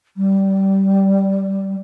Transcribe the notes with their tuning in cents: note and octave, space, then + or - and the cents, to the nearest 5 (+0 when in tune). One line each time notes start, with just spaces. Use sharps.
G3 -15